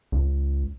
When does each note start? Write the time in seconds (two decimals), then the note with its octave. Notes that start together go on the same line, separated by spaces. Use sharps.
0.12 C#2